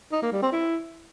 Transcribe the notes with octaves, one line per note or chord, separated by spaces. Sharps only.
D#4
A#3
G3
C4
E4